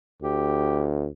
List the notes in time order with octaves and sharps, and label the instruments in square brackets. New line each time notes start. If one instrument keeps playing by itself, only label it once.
[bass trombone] D2 [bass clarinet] G4